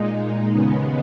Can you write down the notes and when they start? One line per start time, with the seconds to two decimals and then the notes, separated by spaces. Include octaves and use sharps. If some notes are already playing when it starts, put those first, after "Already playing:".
Already playing: A#2 G#3 D#4
0.52 D#2 C#3 G#3 B3